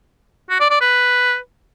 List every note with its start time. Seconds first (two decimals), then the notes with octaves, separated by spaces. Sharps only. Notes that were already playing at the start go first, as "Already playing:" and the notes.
0.50 F#4
0.60 D5
0.71 D5
0.81 B4